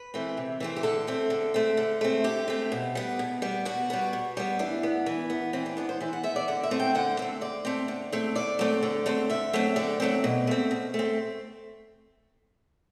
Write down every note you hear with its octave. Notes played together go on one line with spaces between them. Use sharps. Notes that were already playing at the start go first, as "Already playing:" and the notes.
Already playing: B4
E3 A3 C4
C3
E3 A3 C4
G4
D3 A4
A3 C4
D3
A3 C4
D3
A3 C4
D3 G4
A3 C4
B2
G3 B3
B2
G3 B3
B2 F#4
G3 B3
B2
G3 B3
E3 D4
B3
E3
B3
E3 C4
D4
B3 D4
C5
E3 C5
F#5
B3 E5
D5
D3 F#5
E5
A3 C4
G5
D3 F#5
A3 C4
D3 D5
A3 C4
D3
A3 C4
D3 D5
F#3 A3 C4
D3
F#3 A3 C4
D3 E5
F#3 A3 C4
D3 D5
F#3 A3 C4
B2
A3 C4
B2
A3
C4